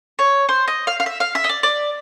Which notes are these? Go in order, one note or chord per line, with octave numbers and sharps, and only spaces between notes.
C#5
C5
D#5
F5
F5
E5
F5
E5
D#5
D5
D5